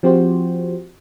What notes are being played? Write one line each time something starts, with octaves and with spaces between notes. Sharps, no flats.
F3 C4 F#4 G4 C5